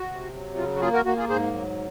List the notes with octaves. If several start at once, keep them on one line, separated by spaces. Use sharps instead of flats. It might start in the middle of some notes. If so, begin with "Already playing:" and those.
Already playing: F#4
C3
F#3
C#3 F4
F#4
A#3 F4 G#4
F#4 A#4
A#3 F#4
F4 G#4
G#2 G#4 C5
F#3